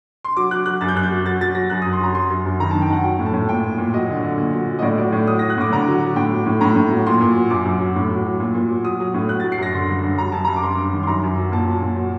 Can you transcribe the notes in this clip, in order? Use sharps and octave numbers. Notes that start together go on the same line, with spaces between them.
C6
F#3 D6
F#3 F#6
F#3 F#6
F#2 A6
G6
F#2 F#6
G6
F#3
F#3 A6
F#3 A6
F#3 A#6
F#2 F#6
F#2 D#6
C6
F#3 A#5
F#3 C6
F#2
F#2
D#3 A#5
D#3 A5
G5
D#3 F#5
F#3 G5
A2
A5
A2
A#2 G5
A#2
A#2
F#3 D#5
D3
D3
A#2
F#3
F#3
D#5
A2 D5
F#3 D5
A2
F#3 D#6
F#3 A#6
F#6
A2 D6
D3 A#5
F#3
F#3
A2 G5
F#3
A2
A2 A#5
A2
F#3
A#2 C6
A#2
F#3
F#2 D6
F#2
F#3
A2
F#3
F#3
A#2
A#2
F#3
F#3 D#6
F#3
A2
F#3 F#6
F#3 A6
C7
F#2 A#6
D3 C6
G2
G2
F#3 A#5
F#2 A5
F#2 A#5
D6
G2 C6
G2
D#3
C6
F#2 A#5
F#2
F#3
A#2 A5
F#3
A#2
F#3